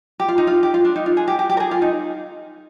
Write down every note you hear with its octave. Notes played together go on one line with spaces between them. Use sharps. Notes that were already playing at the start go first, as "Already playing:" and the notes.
G4
F4
D#4
F4
G4
F4
D4
D#4
F4
G#4
G4
G4
G4
A#4
G#4
F4
D#4